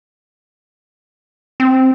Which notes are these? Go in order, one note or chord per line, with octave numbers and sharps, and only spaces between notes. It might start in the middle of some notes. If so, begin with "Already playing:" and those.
C4